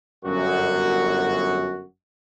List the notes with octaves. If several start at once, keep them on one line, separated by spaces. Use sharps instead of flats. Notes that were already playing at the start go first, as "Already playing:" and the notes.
G1 F#2 F#4